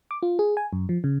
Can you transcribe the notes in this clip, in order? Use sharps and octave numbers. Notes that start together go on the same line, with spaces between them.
D6
F4
G#4
G#5
F#2
F3
C#3